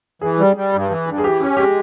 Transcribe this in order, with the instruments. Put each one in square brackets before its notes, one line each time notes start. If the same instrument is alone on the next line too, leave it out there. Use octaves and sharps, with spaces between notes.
[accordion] E3 [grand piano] G#4
[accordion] G3
G3
G2
E3
G2
[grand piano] G#4
[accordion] E3 [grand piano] G4
[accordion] C#4 [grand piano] G4
[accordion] G#3 [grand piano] G4